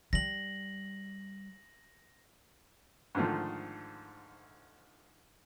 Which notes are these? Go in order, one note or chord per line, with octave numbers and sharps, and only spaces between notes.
G3 A#6 F#7
G#2 D3 D#3 F3 A3